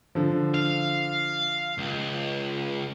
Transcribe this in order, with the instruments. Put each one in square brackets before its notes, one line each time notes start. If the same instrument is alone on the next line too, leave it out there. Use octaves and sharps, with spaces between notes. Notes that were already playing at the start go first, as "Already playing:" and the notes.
[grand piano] D3 F3
[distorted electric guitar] F5
C#2